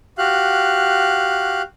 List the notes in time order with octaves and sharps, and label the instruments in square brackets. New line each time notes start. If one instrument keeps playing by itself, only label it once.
[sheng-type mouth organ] F#4 G4 F5 F#6